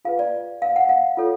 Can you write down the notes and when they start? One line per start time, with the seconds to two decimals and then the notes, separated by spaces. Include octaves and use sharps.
0.05 F4 G#4 B4 F5
0.19 D5
0.62 F5
0.76 F#5
0.89 F5
1.17 F4 A4 C#5